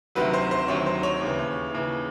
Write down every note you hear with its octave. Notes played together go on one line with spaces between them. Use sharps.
D2 C3 D#3 F#3 B4
C5
C5
D2 C3 D#3 F#3 C#5
C5
C#5
D#2 C#3 E3
D#2 C#3 E3